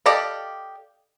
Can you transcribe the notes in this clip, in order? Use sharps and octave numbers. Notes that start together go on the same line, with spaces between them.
G4 A4 D5 D#5 F5